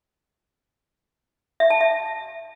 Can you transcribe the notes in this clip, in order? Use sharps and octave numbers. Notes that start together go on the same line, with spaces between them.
E5
A5
E5